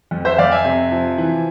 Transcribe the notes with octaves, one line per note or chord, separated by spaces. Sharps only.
F2
C5 E5
F2 D5 F5
E5 G#5
C3
F3
E3